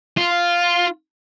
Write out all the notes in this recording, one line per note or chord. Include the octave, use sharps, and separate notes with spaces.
F4